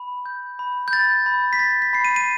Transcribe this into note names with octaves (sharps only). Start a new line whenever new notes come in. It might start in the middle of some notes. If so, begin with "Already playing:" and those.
Already playing: B5
G6
B5
G6
B5 A6
B5
B6
B5 A6
B6
B5 C7
D#7
D#7